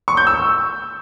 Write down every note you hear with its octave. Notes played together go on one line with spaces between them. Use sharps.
C#6
G6
E6